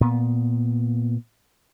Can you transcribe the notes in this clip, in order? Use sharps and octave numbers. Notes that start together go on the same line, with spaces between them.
A#2 B3